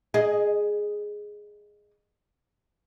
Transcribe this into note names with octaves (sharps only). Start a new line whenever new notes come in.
G#4 D#5